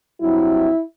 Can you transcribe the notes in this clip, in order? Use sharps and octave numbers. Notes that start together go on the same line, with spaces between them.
G2 F#3 C4 E4